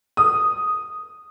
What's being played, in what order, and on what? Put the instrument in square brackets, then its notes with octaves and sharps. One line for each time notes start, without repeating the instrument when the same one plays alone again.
[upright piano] D#6